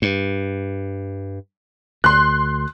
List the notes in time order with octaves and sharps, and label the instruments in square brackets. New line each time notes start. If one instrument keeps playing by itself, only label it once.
[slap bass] G2
[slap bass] D2 [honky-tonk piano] C6 F#6